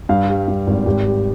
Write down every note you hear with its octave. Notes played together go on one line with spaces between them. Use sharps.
G2 F5
G3
G2
G#1
G#1 G4
G3